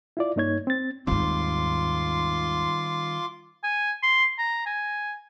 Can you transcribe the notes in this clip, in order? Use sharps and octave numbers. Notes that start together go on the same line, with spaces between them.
E4 F4 D5
G2 A#3 D#4 C#5 G#6
C4 A6
D#2 G#2 D#3 G3 C4 F4 C6 D6
G#5
C6
A#5
G#5